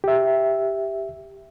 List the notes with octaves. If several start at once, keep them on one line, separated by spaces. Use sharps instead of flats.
G4 E5